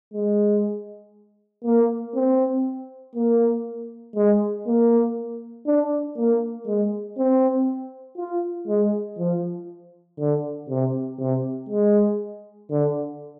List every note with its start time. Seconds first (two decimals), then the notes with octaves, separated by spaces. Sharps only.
0.14 G#3
1.65 A#3
2.15 C4
3.16 A#3
4.16 G#3
4.67 A#3
5.67 D4
6.17 A#3
6.67 G#3
7.18 C4
8.18 F4
8.68 G#3
9.19 F3
10.19 D3
10.70 C3
11.19 C3
11.69 G#3
12.70 D3